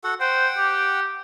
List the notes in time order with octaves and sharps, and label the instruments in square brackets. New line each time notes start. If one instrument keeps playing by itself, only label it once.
[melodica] F#4 A4 F#5
[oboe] C5 [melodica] F#5 G5
[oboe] G4